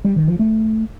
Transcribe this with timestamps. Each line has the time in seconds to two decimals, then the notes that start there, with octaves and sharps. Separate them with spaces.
0.04 G3
0.16 D#3
0.28 F3
0.39 A3